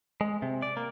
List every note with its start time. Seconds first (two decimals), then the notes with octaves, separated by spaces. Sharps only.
0.21 G#3
0.42 C3
0.62 D5
0.77 A#3